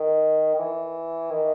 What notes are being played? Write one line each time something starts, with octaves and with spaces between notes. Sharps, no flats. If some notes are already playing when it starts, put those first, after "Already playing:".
Already playing: D#3
D#3
E3
D#3